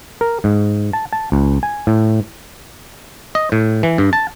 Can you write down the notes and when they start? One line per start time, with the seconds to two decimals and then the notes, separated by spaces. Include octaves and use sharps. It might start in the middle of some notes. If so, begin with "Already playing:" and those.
0.21 A#4
0.44 G#2
0.93 A5
1.13 A5
1.32 C#2
1.63 G#5
1.87 A2
3.35 D#5
3.52 A2
3.83 E3
3.98 G2
4.13 A5